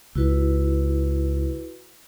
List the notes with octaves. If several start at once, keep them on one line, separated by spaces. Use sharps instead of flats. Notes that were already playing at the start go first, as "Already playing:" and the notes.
C#2 E4 F#4 B4